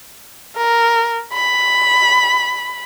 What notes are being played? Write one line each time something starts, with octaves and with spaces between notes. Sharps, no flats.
A#4
B5